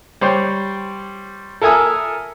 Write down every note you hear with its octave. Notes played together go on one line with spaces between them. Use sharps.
G3 C5 C#5 G5
A4 A#4 E5 G#5 D#6